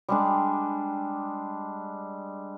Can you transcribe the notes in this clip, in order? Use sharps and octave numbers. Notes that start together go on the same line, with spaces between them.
G3 G#3 D4